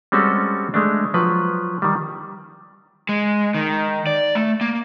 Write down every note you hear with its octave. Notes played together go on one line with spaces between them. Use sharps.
G3 G#3 C4 C#4 F#4 A4
G#3 A3 D4
F3 F#3 B4
D#3 G3
G#3
D#3
D5
A3
A#3